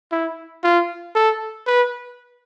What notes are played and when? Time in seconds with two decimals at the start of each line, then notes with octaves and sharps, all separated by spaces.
0.12 E4
0.64 F4
1.15 A4
1.67 B4